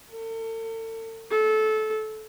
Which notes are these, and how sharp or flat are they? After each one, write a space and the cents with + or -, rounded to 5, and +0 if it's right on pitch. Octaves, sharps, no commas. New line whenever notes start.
A4 +40
A4 -20